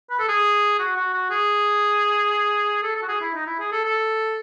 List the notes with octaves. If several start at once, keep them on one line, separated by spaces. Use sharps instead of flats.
B4
A4
G#4
F#4
F#4
F#4
G#4
A4
A4
F#4
G#4
E4
D#4
E4
G#4
A4
A4